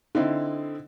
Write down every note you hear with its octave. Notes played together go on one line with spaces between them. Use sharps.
D3 C4 D#4 E4